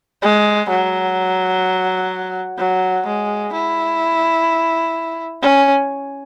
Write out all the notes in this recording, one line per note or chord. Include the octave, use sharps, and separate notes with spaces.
G#3
F#3
F#3
G#3
E4
C#4